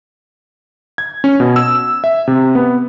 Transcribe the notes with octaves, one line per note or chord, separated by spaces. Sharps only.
G#6
C#4
B2
E6
E5
C3
B3